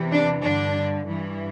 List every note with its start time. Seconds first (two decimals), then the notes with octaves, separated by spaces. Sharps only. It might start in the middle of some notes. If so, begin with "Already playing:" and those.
Already playing: E2 C3 E3
0.12 D4
0.43 G2 D3 D4
1.07 G2 E3